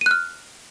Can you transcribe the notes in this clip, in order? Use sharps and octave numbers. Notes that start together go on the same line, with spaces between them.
F6 F#6 D#7